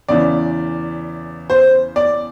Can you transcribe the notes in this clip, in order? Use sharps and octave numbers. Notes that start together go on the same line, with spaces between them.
E2 C#3 E3 D5
C5
D5